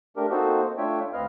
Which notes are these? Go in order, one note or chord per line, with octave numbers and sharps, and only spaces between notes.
A3 D4 G4 A#4
A#3 C4 D#4 F#4 A4 C5
A3 D4 F4 C#5 E5 G5
D2 C4 B4 D#5 F5 F6